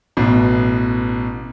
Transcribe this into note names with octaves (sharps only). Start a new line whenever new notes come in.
A1 B2